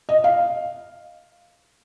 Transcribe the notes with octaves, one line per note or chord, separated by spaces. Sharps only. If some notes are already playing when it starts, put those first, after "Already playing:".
D#5
F5